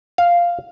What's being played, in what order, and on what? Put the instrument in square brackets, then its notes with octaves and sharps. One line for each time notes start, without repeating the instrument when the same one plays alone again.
[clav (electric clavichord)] F5